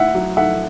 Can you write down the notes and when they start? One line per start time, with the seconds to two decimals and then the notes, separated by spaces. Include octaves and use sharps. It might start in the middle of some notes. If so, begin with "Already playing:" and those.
Already playing: A2 E5 F#5
0.14 F#3
0.37 A3 E5 F#5